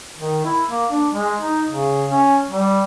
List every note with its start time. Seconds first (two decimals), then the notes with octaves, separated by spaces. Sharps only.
0.17 D#3
0.45 E4
0.69 A#3
0.91 D4
1.12 G#3
1.40 D#4
1.68 C#3
2.10 C#4
2.51 G3